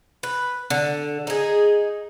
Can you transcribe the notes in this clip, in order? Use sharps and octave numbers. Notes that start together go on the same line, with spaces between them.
B4
D3
D#4 G#4